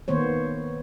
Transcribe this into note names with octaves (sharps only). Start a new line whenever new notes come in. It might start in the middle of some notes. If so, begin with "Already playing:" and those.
D#3 A#3 B3 C5 C#5